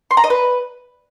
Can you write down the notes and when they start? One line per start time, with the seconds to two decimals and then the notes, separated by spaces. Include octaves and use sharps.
0.11 C6
0.17 A#5
0.24 D#5
0.30 B4